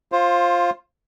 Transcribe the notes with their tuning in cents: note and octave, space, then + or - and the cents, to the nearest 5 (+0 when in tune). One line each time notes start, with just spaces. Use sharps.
F4 +0 C5 +20